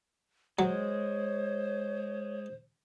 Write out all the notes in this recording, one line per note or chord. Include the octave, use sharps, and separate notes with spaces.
F#3 G#3 C5 C#5